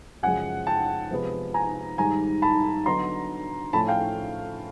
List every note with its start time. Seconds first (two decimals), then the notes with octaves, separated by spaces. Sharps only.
0.23 F#2 C#3 F3 G#3 F#5 G#5
0.67 G5 A5
1.11 C3 F3 G#3 B3
1.54 G#5 A#5
1.98 G#2 D#3 G3 G#5 A#5
2.42 A5 B5
2.86 D3 F#3 B3 D#4 A#5 C6
3.73 A2 F3 A3 C#4 A5 B5
3.88 F5 G5